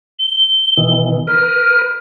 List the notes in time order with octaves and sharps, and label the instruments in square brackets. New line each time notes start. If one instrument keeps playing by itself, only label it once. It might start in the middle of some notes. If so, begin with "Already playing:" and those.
[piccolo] G7
[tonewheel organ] B2 D#3 E3
[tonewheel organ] A#4 B4 [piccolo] F6